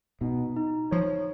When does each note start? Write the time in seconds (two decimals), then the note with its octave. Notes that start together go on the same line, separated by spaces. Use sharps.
0.21 B2 D#4
0.56 D#4
0.91 F3 C#5